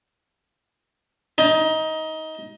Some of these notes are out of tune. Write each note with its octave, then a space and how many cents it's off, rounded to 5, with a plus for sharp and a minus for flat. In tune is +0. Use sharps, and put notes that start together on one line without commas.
D#4 +20